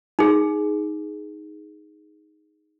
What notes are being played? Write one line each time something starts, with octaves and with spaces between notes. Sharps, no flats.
D#4 G#4